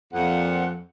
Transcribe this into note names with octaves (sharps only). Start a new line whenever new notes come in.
F2 A#2 F3 F#5